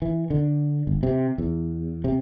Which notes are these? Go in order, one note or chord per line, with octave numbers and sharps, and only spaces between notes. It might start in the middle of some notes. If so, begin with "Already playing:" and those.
E3
D3
G1
C3
E2
C3